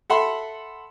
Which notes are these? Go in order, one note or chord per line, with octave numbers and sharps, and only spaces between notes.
A4 E5 F#5 B5 C6